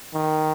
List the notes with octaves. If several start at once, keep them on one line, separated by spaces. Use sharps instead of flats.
D#3